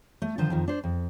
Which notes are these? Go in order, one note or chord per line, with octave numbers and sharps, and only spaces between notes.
A3
D3 D#3 F3 C5 A5
F2 D#3 F3
D4 C5
F2